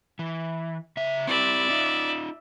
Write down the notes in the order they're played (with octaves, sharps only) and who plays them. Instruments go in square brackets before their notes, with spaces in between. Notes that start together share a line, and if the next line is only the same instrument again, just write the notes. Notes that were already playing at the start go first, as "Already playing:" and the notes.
[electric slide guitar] E3
C#3 E5
[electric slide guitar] C4 E4 G4 [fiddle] D5 E5
[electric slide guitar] D#4 F4